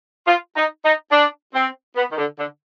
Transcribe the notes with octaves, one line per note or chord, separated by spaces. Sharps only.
F4
D#4
D#4
D4
C4
B3
D#3
D3
D3